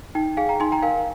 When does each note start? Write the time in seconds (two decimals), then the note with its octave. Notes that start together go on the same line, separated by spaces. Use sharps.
0.15 D#4 G5
0.37 G#4 F5 G#5
0.49 G5 A#5
0.60 D#4 G#5 C6
0.72 G5 A#5
0.83 A#4 F5 G#5